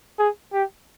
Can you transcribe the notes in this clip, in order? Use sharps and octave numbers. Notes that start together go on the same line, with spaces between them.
G#4
G4